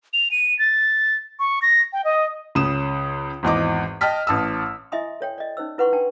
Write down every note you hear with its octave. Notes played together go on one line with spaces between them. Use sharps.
F7
D#7
A6
C#6
A#6
G5
D#5
C#2 C#3 D#6 E7
G#1 E2 D#5 D6
D#5 G5 A5 F6 B6
A1 A5 D#6 E6
E4 D#5 E5 G#5 C6 D#6
A4 C#5 G5
D5 D#5
C#4 D#4 C5 E6
E4 B4 F#5 C6 C#6
D4 G5 A5